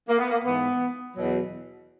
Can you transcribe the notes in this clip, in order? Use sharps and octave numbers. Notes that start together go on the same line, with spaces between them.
A#3
B3
A#3
G#2 E3 B3
E2 B2 F#3